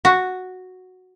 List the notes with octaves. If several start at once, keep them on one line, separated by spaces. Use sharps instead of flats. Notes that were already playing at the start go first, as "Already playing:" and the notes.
F#4